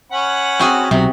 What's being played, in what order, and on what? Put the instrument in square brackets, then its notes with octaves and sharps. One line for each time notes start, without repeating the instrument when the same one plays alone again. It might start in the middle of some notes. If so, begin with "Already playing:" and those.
[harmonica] C#4 F#5 B5
[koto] C4 F#4 G#4
[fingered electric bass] B1 [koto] C3 [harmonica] F#3